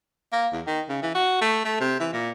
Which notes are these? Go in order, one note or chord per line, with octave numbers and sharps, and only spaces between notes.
A#3
E2
D#3
C#3
E3
F#4
A3
A3
C3
E3
A#2